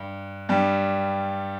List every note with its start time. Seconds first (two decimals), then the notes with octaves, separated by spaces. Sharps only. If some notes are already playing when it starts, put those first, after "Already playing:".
Already playing: G2
0.49 G2 G3